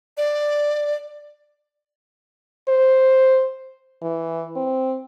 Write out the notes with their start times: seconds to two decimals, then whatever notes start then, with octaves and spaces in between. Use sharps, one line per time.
0.17 D5
2.69 C5
4.02 E3
4.56 C4